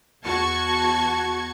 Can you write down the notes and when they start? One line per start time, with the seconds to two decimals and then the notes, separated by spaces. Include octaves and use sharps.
0.25 E2 F#4 A5 C#6 G#6